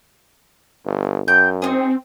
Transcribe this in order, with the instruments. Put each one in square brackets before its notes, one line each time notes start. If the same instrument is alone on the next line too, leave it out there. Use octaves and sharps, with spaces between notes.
[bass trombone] G1
[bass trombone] F#2 [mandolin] G5 G6
[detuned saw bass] C4 [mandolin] D#4 F4 G#4